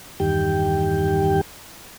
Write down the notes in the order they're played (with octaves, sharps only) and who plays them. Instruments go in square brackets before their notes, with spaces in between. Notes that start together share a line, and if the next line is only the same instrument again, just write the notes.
[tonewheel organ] E2 G2 D#3 G4 G5